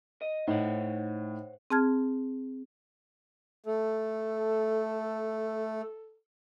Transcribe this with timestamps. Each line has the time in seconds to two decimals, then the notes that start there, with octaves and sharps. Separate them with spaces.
0.21 D#5
0.48 A2 D#4 C5 C#5 F#5
1.70 C4 G#4 A5 F6 G#6
3.66 A3 A4